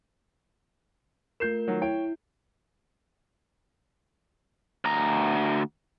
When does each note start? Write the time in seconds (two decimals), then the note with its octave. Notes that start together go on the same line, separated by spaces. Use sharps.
1.40 A3 F4 A#4 G6 C7 E7
1.68 D#3 F#3
1.82 E4 C#5 G5 D7
4.85 D2 A#5